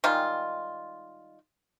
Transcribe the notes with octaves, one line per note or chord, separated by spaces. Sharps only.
D#3 G3 G#3 F4